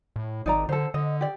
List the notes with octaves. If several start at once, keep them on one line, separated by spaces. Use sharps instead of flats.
A2
G#1 D#4 D5 A#5
D3 A4 C5
D3 D#5
G4 D5